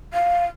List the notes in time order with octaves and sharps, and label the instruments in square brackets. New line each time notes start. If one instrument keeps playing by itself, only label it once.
[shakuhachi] F5